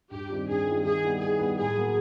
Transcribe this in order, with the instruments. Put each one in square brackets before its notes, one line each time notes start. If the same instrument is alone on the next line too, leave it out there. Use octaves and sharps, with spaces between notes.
[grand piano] G2 [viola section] G4
[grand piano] D#3 G3 C4 F4
[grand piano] G2 [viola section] G#4
[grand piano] D#3 G3 C4 F4
[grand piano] D#3 [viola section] G#4
[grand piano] G3 B3 E4
[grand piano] D#3 [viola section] G#4
[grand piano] G3 B3 E4
[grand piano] A2 [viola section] G#4
[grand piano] F#3 A#3